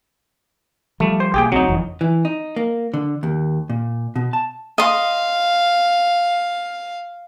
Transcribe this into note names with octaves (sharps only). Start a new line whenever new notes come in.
F3 G3 A3
C5
B1 A#3 G4 G#4 G5
D2 F#3 C4 D#4
F#1 F2 E3
E3
D#4
A#3
D3
D#2
A#2
B2
A5
D#5 F5 C6